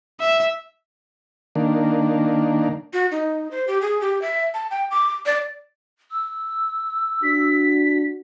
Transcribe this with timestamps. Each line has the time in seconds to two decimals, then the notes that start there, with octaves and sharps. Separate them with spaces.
0.20 E5
1.55 D#3 A#3 D4
2.93 F#4
3.11 D#4
3.51 C5
3.67 G4
3.81 G#4
4.01 G4
4.22 E5
4.54 A5
4.71 G5
4.91 D6
5.26 D5
6.11 E6
7.23 D4 F#4 B6